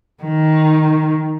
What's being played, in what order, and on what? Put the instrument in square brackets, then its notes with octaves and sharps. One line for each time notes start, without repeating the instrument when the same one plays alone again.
[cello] D#3